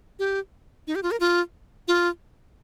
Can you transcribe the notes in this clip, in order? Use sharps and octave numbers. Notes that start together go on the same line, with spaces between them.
G4
D#4
G4
F4
A#4
F4
F4